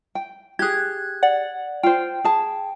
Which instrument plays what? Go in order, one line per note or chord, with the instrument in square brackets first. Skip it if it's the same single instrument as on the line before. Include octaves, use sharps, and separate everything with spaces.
[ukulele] G5
[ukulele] G4 G#4 [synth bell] F#6 G#6
[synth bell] D5 F#5
[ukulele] F4 C5 [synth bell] G5
[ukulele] G#4 A5